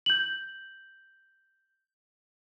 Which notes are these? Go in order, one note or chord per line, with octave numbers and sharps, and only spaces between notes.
G6 F#7